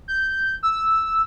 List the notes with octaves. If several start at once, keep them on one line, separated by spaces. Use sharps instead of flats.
G6
E6